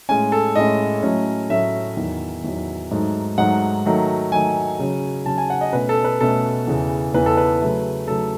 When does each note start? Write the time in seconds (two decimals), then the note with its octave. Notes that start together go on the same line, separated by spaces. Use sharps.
0.09 A2 G#3 C#4 G#5
0.32 A4
0.55 A2 G#3 C#4 D#5
1.03 A2 F#3 A3 C#4
1.50 A2 F#3 A3 C#4 E5
1.97 E2 D#3 F#3
2.44 E2 D#3 F#3
2.91 G#2 F#3 A3 D#4
3.38 G#2 F#3 A3 D#4 F#5
3.85 D#3 F#3 A3 D#4
4.32 D#3 F#3 A3 D#4 G#5
4.80 C#3 F#3 C#4
5.26 C#3 F#3 C#4 A5
5.38 G#5
5.50 F#5
5.61 D#5
5.73 B2 A3 C#4 B4
5.89 A4
6.04 B4
6.20 B2 A3 C#4 A4
6.67 E2 C#3 E3
7.14 E2 C#3 E3 B4
7.26 A4
7.37 B4
7.61 C#3 F#3 A3
8.08 C#3 F#3 A3 A4